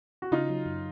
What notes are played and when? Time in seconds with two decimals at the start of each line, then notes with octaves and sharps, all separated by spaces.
0.22 F#4
0.32 C#3 D#4 F4
0.49 F#3
0.66 F#2